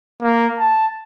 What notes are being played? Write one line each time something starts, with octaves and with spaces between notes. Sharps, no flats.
A#3
A5